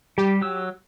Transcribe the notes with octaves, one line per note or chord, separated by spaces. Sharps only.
G3 G4
F#3 E6